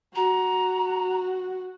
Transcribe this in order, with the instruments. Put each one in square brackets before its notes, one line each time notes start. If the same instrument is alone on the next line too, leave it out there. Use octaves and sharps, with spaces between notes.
[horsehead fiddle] F#4 [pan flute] A#5